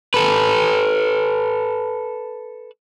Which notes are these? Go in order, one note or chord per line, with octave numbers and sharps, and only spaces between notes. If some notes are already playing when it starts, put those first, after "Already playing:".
A4 B4